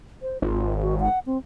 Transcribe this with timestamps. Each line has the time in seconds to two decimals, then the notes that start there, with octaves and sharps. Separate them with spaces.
0.22 C5
0.42 G#1 F4
0.82 F#4
1.00 F#5
1.26 C4